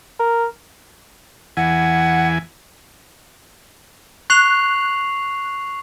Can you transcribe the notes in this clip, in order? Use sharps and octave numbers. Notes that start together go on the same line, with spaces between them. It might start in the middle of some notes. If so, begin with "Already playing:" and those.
A#4
E2 E3 F#5 G#5
C#6 F#6 C7 F7